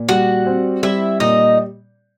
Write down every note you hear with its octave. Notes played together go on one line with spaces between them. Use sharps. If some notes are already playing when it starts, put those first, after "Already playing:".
Already playing: A#2
G3 F#4 F#5
C4
G3 E4 E5
A#2 D#4 D#5